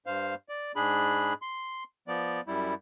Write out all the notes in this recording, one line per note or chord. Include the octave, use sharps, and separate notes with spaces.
G2 C5 F5
D5
G#2 D4 G#4 B5
C6
F3 B3 D5
F#2 G3 E4